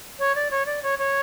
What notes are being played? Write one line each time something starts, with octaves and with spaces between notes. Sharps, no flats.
C#5
D5
C#5
D5
C#5
C#5